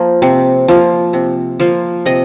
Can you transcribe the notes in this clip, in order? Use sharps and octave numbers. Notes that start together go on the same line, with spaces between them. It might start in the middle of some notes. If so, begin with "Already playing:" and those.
Already playing: F3 A#3
C3
F3 A#3
C3
F3 A#3
C3 D#5